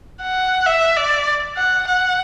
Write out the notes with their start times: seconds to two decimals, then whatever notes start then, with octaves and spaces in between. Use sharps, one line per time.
0.22 F#5
0.66 E5
0.97 D5
1.57 F#5
1.87 F#5